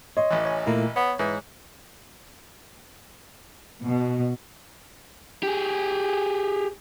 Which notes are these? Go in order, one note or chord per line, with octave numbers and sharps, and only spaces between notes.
C#5 D#5 C6
A1 E3
C#5 G#5
A#2 A3 A#3 E4
B3 C#5
G#2 E3
B2
G4 G#4